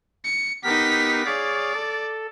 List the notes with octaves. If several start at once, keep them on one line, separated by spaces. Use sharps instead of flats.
C#7
B3 D#4 G4 A#4 B6
G#4 C#5 D5 F5
A4